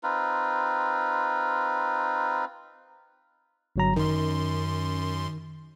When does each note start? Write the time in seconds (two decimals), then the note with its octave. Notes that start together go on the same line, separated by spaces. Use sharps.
0.03 C4 D#4 F4 B4
3.76 G1 F#3 A#5
3.96 F#2 D#3 C6